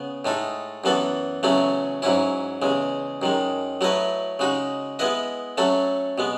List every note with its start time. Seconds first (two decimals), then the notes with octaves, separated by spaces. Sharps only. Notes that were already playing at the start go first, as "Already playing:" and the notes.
Already playing: C#3 B3
0.25 A2 G#3 D#4 A4
0.84 F#2 E3 B3 F#4 A4
1.43 E2 C#3 F#3 A3 C#4
2.02 G#2 F#3 C#4 E4
2.62 E2 C#3 G#3
3.22 F#2 D#3 G#3
3.81 F#3 A3 E4 B4 D#5
4.39 C#3 G#3 D#4 F#4
4.99 G#3 B3 E4 B4 D#5
5.57 F#3 A3 C#4 F#4 A4
6.18 B2 G#3 B3